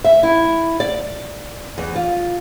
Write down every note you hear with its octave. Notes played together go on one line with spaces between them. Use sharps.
E5
E4
D5
E2
F4